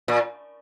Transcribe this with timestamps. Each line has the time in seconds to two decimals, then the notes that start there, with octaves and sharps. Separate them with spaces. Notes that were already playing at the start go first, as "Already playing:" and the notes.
0.08 A#2